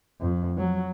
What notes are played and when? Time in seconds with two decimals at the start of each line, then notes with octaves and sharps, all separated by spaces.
0.21 F2
0.57 F#3